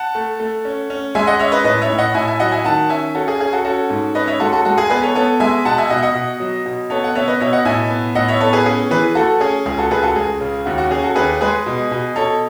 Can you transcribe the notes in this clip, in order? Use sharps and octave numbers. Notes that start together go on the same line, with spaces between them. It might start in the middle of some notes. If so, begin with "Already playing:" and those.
Already playing: F#5 A5
A3
A3
C#4
C#4
G#3 E5 G#5
D#5 F#5
C#4 C#5 E5
B4 D#5
A2 B4 D#5
C#5 E5
A2
D#5 F#5
A2 E5 G#5
E5 G#5
F#3 D#5 F#5
E5 G#5
D#3 F#5 A5
C#4 E5 G#5
C#4 F#4 A4
G#4
C#4 G#4
F#4 A4
C#4 F#4 A4
G#2
C#4 B4 D#5
C#5 E5
G#3 F#4 A4
F#4 A4
G#3 F#4 A4
G#4
B3 G#4 B4
A4 C#5
B3 A4 C#5
G#3 E5 G#5
B2 F#5 A5
E5 G#5
B2 D#5 F#5
E5
D#5 F#5
B2
F#3
B2
B3 A4 C#5
F#5
B3 C#5 E5
B4 D#5
B2 C#5 E5
D#5 F#5
A2 E5 G#5
B3
A2 D#5 F#5
C#5 E5
B3 A4 C#5
G#4 B4
C#4 G#4
E3 G#4 B4
A3 F#4 A4
C#4 G#4
C#2 G#4
F#4 A4
C#2 G#4 B4
F#4 A4
C#2 G#4
C#3
D#2 F#4
F#4
C#4 G#4
F#4 A4
D#2 G#4 B4
G#3 G#4 B4
B2
B2
B2 A4 C#5